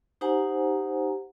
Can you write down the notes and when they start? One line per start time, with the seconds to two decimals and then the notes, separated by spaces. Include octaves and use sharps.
0.21 D#4 G4 C5 F#5 G#5 A#5